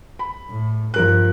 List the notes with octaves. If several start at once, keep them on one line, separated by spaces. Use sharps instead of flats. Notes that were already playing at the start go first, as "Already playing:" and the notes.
B5
A2
G2 F3 A#4 F#6